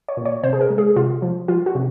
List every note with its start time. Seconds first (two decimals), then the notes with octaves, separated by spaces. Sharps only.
0.08 C#5
0.17 A#2
0.25 C#5
0.43 C3 C5
0.53 G#4
0.61 A#4
0.70 G#3
0.78 G#4
0.96 C3 F4
1.22 F3
1.48 F3 F4
1.66 F#4
1.75 C3